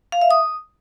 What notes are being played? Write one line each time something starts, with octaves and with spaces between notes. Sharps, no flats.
F5
E5
D#6